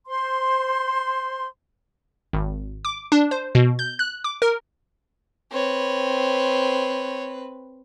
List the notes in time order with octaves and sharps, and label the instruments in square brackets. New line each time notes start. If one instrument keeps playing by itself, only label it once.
[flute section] C5 C6
[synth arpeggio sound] G#1
D6
D4
C5
B2
G6
F#6
D6
A#4
[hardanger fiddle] C4 B4 [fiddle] C#5